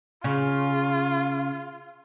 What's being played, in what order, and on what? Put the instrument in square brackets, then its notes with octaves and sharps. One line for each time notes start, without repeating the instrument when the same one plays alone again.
[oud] C#3 [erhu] F4